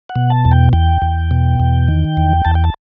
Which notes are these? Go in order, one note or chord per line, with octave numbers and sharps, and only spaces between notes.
F#5
B2
A5
E2
G5
E2 G5
E2
B2
E2
D#3
E2
E2 A5
G5
A5